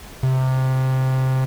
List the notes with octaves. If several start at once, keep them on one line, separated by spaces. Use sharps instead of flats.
C3